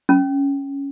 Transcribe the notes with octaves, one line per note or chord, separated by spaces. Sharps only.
C#4